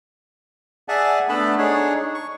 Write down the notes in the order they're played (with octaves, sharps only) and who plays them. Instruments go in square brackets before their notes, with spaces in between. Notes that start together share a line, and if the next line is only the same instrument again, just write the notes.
[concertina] G#4 D5 E5 F#5 G#5 A5
A3 B3 D4 A4 A5 B5
D4 D#4 G#4 C#5
C#6